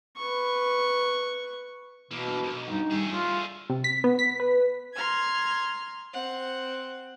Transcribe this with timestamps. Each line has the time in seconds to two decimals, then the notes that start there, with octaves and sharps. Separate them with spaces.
0.17 B4 C#6
2.11 B2 E3 A#3
2.28 D4
2.43 B1 A#4 C5
2.67 G2 D#4 F#5
2.91 D#3 G3 A3 G#4
3.09 G3 F4 D5
3.70 C3
3.84 B6
4.04 B3
4.19 B6
4.40 B4
4.95 A#5 C6 F6 G#6
6.13 C4 F#5